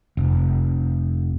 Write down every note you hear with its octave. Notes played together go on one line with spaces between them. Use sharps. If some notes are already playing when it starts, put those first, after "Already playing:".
F1